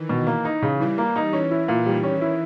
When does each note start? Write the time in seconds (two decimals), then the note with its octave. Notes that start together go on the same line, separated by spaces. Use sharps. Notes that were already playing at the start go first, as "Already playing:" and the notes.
Already playing: D#3 E3
0.09 B2
0.27 E3 A#3
0.45 D#4
0.62 C#3
0.80 E3 G3
0.98 A#3
1.16 D#4
1.33 E3 C#4
1.51 E4
1.68 A#2
1.86 D#3 G3
2.03 C#4
2.21 E4